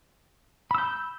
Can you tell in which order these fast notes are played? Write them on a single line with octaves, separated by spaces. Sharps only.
B5 E6 G6